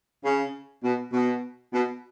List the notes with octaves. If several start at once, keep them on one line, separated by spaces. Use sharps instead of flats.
C#3
B2
B2
B2